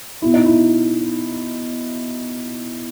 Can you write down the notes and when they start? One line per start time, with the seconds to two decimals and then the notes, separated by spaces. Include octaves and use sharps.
0.22 B2 E4
0.34 D#4
0.46 E4